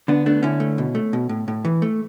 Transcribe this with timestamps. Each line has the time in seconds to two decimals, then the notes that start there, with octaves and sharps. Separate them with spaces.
0.08 D3 B3 D4
0.26 A3 B3 D4
0.43 D3 C#4 E4
0.60 A3
0.78 B2
0.95 A3
1.13 B2
1.29 A2
1.48 A2
1.65 E3
1.82 A3